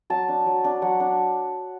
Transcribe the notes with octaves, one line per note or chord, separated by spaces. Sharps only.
F#3 A5
D4
F#3
D4
F#3 F#5
D4